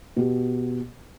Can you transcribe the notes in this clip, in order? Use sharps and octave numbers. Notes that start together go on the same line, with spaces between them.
B2 G4